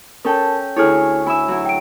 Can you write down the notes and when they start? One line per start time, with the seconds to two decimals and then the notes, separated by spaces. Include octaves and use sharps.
0.25 C#4 A4 A#4 G5 A5
0.77 D2 E4 G#4 A4 C#5 F6
1.26 E4 E5 G#5 B5 E6
1.48 F#3 E4
1.66 G5 D7